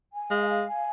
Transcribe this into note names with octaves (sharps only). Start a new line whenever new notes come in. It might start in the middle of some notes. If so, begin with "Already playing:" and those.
G#5
G#3 F5
F5
G#5